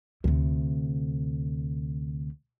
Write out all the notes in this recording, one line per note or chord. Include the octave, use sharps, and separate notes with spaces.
D2 C3